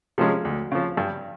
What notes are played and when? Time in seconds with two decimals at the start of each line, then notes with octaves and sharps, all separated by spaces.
0.18 C3 F3 G#3 C#4
0.45 D2
0.72 C#3 F3
0.97 G2